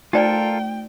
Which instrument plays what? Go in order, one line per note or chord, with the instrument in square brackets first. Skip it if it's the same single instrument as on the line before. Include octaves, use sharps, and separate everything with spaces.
[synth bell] A3 [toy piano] D#4 C5 D5 [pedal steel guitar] F4 A4 A#4 [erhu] G5